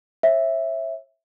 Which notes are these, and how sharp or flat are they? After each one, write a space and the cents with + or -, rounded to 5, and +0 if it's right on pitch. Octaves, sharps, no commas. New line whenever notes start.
C#5 -40 E5 +0